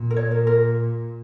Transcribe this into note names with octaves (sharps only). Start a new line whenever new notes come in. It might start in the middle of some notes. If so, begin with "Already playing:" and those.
Already playing: A#2
A#4
C#5
A#4
A#4